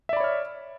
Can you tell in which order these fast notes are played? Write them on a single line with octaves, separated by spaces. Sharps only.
E5 D5 B5 C#5 F6